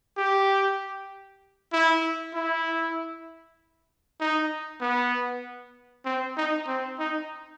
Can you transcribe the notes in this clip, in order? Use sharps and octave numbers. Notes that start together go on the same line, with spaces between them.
G4
E4
E4
D#4
B3
C4
D#4
C4
D#4